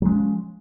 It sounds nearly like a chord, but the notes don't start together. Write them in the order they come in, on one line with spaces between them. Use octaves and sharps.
F#3 G#3 C#4 F3